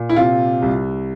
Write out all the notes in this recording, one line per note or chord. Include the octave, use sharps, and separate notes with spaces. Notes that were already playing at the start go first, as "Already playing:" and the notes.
Already playing: A#2
E4
C3 F4
C2